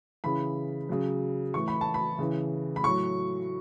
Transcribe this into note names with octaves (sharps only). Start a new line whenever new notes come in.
C#3 E3 B5
C#3 F#3
A2 E3 C#6
B5
A5
B5
C#3 E3
B5
A2 F#3 C#6